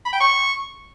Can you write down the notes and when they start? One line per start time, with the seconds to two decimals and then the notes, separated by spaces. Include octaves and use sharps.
0.05 B5
0.13 G5
0.20 C#6